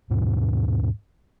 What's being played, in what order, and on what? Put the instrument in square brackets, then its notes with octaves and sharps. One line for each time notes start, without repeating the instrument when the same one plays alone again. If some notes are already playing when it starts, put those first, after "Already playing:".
[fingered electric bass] D#2 G#2 B2 E3